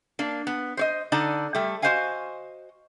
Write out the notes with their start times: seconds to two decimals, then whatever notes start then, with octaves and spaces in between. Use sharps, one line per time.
0.19 A#3 D4
0.47 B3
0.77 C5 C#5 D#5
1.12 D3 D#4 D5 A5
1.55 G3 A3
1.82 F#4 G4 C5 D#5 F5 G#5